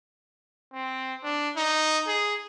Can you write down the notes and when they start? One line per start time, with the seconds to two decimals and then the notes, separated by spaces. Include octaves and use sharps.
0.73 C4
1.23 D4
1.56 D#4
2.08 G#4